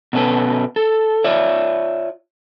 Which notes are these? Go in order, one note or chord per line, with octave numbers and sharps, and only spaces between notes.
B2 C#4 A4 B4
A4
F4 C#5 D5 E5